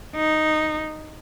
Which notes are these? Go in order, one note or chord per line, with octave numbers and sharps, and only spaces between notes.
D#4